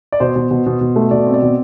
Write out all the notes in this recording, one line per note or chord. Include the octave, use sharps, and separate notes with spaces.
D5
B2 C5
B2
B2
B2
B2
A3
B2 D5
C4
D5
B2